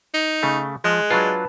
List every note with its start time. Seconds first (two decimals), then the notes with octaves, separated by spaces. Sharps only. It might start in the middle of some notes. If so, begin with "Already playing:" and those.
0.14 D#4
0.43 C#3 A3
0.84 F3 G#3 F#6
1.10 F#3 D4 F4 B4 A5 B5